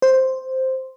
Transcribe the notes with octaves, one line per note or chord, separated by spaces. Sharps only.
C5